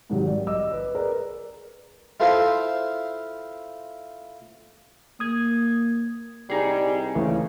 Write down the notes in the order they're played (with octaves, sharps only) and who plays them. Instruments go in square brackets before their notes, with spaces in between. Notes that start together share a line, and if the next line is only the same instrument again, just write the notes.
[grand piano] G#2 C3 D#3 F#3 G3
D5
D#5 D6 E6
B4
G#4 A#4 B4 D5
[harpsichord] E4 F4 A4 C5 E5 F5
[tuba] A#3 [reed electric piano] D#6 G#6
[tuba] C2 [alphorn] G3 [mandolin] D#4 G#4
[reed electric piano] C#2 E3 A3 [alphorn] C#3